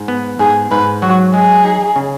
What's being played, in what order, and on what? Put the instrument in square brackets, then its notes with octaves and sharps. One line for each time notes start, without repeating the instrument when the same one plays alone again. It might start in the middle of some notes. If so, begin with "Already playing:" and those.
Already playing: [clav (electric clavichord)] G#2
B3
[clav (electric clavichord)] G#2 [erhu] G#4
[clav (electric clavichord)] G#2 [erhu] B4
[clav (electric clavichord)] F#3 [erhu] F#4
[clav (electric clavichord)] G#3 [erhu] G#4
[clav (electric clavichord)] D#4
C#3